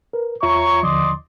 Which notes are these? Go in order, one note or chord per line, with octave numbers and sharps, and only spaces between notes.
A#4 B4
E2 F4 C#5 E5 A#5 C#6
D#2 D3 F3 D5 D#5 C6